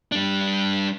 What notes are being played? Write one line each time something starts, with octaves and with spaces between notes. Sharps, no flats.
G3 D4